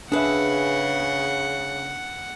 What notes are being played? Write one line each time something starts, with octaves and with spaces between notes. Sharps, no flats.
C#3 D4 G#4 B4 E5 F#5